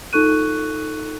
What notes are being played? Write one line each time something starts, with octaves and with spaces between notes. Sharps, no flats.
D#4 F4 A4 C#6 F#6 D#7